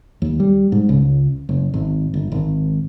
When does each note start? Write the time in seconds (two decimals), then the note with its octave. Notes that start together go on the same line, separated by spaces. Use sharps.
0.22 D#2
0.40 G3
0.72 G#2
0.89 C#2
1.49 F#1
1.74 G#1
2.14 G1
2.32 G#1